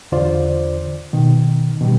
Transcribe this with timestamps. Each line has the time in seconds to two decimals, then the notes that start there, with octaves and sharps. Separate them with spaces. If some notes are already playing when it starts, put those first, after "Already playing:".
0.12 E2 D3 F4 C5 D5
1.13 B2 D#3
1.81 B2 D#3 G3